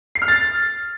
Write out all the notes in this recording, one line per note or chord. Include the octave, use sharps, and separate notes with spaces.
C7
F6
A6